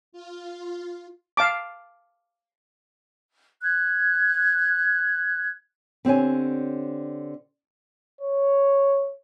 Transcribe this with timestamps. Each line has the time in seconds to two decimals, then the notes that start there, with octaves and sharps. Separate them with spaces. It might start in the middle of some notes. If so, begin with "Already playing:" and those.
0.12 F4
1.37 F5 A5 D6
3.63 F#6 G#6
6.05 D3 C4 G4 C#5 G#5
8.21 C#5